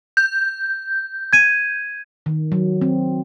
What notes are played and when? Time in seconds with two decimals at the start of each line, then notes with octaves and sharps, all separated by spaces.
0.17 G6
1.33 G#6 D#7
2.26 D#3
2.52 F#3
2.81 C4